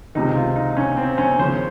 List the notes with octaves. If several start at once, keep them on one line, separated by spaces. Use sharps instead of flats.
C#2 C3 D#3 D#4
F4
D#4
C#4
C4
C#4
D#2 C#3 F3 C5